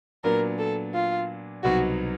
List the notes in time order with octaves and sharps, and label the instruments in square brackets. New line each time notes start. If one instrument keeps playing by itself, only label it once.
[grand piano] A#2 F#3 B3 D4 [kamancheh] A#4
[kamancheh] A4
F4
[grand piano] C2 B2 F#3 B3 D#4 [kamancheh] F#4